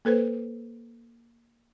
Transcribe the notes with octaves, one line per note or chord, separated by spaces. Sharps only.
A#3 A4 B4 C5